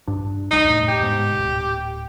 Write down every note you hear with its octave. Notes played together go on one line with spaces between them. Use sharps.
G2 D4
D1 C2 G3 D#4
F1 E2 A2
G4
G#2 B2
D1